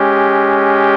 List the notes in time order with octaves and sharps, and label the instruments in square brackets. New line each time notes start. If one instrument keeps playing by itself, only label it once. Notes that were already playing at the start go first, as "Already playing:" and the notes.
Already playing: [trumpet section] G#3 C#4 G4